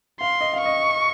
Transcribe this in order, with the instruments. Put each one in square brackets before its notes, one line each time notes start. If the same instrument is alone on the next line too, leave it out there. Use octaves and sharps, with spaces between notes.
[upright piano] F5 [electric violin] C6
[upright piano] D#5
F5
[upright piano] D#5 [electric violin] C#6